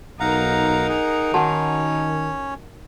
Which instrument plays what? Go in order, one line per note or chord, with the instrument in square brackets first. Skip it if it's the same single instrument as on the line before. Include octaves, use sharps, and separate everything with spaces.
[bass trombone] B1 [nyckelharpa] D#4 A#4 [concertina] F5 F#5 A#5
[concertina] G#4 F#5
[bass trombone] D#3 [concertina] C#4 C#5 [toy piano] F#4 F#5 A5